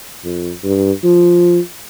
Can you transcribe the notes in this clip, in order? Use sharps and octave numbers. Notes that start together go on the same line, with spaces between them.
F2
G2
F3